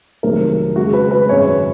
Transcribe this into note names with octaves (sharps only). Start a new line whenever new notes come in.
F1 F2 D#3 F#3 A#4
C#2 C#3 G#3 F#4
B4
B4
G#1 F#2 C#3 G#3 C#5